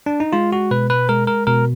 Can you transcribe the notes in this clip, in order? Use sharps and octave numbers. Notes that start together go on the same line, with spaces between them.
D4
D#4
G#3 F4
F#4
B2 B4
B4
G#3 A#4
A#4
B2 A#4